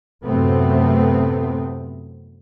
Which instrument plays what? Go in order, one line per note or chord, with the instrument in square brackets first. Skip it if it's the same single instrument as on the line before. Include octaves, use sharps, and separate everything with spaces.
[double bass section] F#2 A2 C3 A3 B3 C4